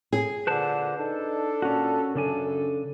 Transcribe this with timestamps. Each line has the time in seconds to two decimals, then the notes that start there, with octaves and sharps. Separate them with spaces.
0.13 G#4
0.47 A#2 D3 B4 C5 A5
0.97 D4 D#4 A4
1.62 A#2 C#4 F#4
2.15 F#2 C#3 D4 A4 G#5